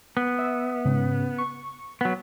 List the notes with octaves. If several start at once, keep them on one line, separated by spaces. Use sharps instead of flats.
B3
E5
G#2 C#3
C#6
F#3 B3